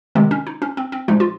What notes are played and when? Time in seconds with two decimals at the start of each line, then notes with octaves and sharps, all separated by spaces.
0.15 C3 D#3 G#3 C4
0.31 C#4
0.47 D#4
0.62 C#4
0.77 C4
0.92 C4
1.08 A#2 F3 G#3 D#4
1.20 F4